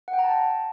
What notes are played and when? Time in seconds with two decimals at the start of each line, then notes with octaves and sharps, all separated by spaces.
0.08 F#5
0.13 G5
0.19 A#5
0.24 A5
0.30 A#5